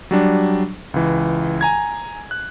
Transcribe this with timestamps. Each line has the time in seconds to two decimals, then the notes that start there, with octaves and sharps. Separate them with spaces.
0.11 F#3 G3 D4
0.94 C#2 E3
1.61 G#5 A#5 G#6
2.31 F#6